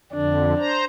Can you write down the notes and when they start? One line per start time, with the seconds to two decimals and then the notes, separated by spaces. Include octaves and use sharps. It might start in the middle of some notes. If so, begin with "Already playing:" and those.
0.13 F2 D3 D4
0.58 C5 A#5